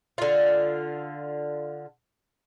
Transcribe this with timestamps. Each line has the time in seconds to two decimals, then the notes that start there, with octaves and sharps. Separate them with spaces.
0.18 D3 F4